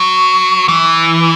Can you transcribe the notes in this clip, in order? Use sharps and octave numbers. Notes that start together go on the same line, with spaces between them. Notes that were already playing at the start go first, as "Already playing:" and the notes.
Already playing: F#3
E3